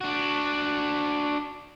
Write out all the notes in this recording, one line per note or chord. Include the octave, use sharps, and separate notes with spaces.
D4 F#4